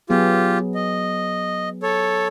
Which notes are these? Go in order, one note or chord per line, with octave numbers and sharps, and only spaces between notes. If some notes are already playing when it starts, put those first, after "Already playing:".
F#3 B3 F4 G4 G#4
D#5
A4 C#5